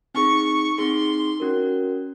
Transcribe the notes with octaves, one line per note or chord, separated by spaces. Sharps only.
C4 D#4 G#4 C#6
C4 D#4 G#4 C6
C#4 F#4 A#4